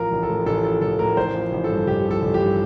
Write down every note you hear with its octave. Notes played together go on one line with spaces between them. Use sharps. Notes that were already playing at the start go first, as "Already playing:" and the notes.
Already playing: A1 F3 A#4
A1
A4
A2
A1 A4
F3 A4
A1 A4
A2 A#4
A1 C5
F3
A1
A4
G2
A1 G4
F3
A4
A1
G4
G2